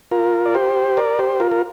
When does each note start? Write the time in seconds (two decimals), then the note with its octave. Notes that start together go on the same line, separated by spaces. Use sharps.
0.11 F4 A#4
0.46 D5
0.55 G4 C5
0.97 A#4 D5
1.19 G4 C5
1.40 F4 A#4
1.51 A#4